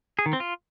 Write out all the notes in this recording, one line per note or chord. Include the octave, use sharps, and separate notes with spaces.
G#4
D#3
C4
F4